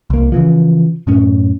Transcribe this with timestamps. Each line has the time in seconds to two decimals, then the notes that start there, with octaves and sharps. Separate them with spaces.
0.10 C2 A#3
0.32 C#3 E3 F3
1.07 F#2 A2 C#4